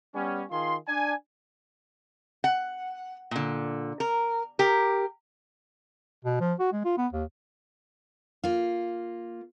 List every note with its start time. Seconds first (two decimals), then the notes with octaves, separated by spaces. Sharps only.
0.15 G3 B3 C#4
0.51 D#3 F4 G#4 C6
0.87 D4 G#5
2.44 F#5
3.31 A#2 D3
4.00 A#4
4.59 G4 A#4
6.25 B2
6.41 F3
6.59 F#4
6.73 G#3
6.85 F4
6.97 B3
7.13 D#2
8.44 A#3 F4